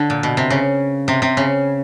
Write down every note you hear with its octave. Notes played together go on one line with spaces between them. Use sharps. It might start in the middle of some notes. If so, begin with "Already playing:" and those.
Already playing: D3
A#2
B2
C3
C#3
C3
C3
C#3